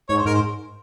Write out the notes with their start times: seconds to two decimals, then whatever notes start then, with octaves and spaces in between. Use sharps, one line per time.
0.09 G#2 C#5
0.18 C5
0.25 G#2 A#4
0.34 C5